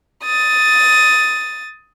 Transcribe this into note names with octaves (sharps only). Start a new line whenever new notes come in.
D#6 A6